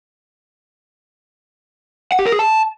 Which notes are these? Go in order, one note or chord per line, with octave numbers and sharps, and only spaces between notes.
F#5
G4
A#4
G#4
A5